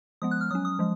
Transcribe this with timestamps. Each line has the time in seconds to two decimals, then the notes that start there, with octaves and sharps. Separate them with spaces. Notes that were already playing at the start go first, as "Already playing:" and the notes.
0.22 F3 G#3 B3 D#6
0.31 F#6
0.41 F6
0.50 F#3 C#4 D#6
0.65 D#6
0.79 F3 G#3